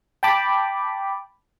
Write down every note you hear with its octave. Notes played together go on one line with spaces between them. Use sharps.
G5 A5 B5 D6